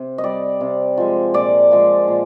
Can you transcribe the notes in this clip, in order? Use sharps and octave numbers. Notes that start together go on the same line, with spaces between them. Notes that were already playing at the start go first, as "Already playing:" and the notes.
Already playing: C3
D#5
G3 D5
C3
F3 G#3
A#2 D5
F3 G#3
A#2